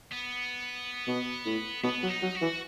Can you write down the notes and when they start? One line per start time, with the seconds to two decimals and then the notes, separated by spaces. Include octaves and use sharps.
0.12 B3
1.07 B2
1.45 A2
1.83 B2 B3
2.03 F#3
2.09 D#4
2.22 F#3
2.35 F#4
2.41 E3